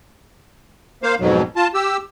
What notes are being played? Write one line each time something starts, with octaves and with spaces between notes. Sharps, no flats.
A#3 C5 F5
F2 G#2 B2 F#3
F4 A5
G4 E6